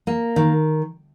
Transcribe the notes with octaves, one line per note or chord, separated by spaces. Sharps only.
A#3
D#3